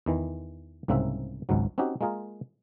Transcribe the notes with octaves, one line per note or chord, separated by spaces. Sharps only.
E2 D#3 E3
C2 G#2 C#3 A#3 C4 E5
G#1 C#2 G#2 F#3
C4 C#4 D#4 F#4 G4
G#3 A#3 F4 G#4 A#4